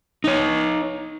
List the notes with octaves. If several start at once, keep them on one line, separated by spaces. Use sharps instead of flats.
D#4 C#5